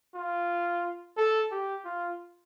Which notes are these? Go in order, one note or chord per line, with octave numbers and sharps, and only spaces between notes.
F4
A4
G4
F4